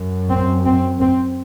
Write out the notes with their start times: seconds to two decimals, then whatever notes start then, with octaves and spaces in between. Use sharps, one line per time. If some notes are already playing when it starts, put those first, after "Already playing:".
Already playing: F#2
0.30 C4
0.65 C4
1.01 C4